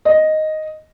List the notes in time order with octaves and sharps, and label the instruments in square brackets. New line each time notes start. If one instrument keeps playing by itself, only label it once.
[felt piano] D#5